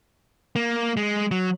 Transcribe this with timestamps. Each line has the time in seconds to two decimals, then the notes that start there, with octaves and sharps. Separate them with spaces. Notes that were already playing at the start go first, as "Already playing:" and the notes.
0.56 A#3
0.97 G#3
1.31 F#3